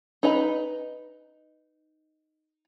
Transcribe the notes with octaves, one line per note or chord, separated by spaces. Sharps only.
D#4 B4 D#5 A#5 B5